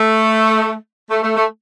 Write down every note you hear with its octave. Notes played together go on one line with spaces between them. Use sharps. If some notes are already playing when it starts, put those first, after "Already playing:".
Already playing: A3
A3
A3
A3